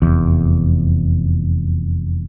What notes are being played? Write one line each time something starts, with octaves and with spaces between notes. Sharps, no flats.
F1 E2